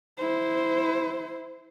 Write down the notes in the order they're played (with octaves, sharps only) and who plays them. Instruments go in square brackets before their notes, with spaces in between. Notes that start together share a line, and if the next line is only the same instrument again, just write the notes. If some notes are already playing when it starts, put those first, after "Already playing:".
[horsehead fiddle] E4 C5